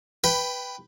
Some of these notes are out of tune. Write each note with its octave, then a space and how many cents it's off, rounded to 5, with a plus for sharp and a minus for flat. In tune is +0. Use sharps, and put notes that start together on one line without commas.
B4 +5 G5 +0 B5 +20